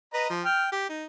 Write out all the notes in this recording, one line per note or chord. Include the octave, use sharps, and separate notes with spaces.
B4 D#5 A#5
F3
G5 F6
G4
D#4